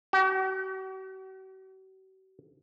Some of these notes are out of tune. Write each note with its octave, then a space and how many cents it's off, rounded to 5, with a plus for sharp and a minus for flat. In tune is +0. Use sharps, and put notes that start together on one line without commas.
F#4 +45